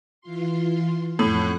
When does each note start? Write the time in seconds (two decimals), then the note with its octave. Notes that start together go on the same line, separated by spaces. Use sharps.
0.21 E3 F4 C6
1.19 F2 A2 F#5 F#6